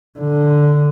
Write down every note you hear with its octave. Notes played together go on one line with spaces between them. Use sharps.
D3